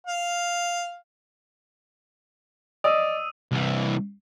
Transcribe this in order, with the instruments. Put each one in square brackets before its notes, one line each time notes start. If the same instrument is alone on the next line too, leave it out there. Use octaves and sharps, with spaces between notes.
[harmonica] F5
[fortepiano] D5 D#5 [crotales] D#6 E6 D#7
[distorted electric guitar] C2 E3